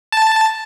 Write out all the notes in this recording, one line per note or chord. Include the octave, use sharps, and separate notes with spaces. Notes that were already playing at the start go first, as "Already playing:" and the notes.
A5